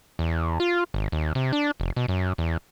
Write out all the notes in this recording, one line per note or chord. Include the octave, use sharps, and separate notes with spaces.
E2
F4
G#1
D#2
C3
D4
F1
B2
F#2
E2